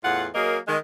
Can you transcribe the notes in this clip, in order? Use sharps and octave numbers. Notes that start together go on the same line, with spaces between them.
E2 A2 F4 F#5
F#3 A#3 G#4 A#4 D#5
D#3 G#3